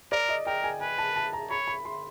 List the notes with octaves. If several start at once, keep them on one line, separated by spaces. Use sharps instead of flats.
A#4 D5
D#5
A#4 G5
G#5
B4 G#5
A5
A5
A#5
C#5 B5
B5
C6